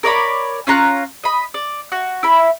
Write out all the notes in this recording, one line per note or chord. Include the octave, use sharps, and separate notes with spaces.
A#4 C#5 D5 B5
C#4 F4 A#5 F#6
D#5 B5
D5
F#4
E4 B5